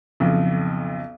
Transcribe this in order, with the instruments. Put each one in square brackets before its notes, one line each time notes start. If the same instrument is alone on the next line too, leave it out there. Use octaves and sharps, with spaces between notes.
[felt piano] B1 F2 [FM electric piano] C#3 F3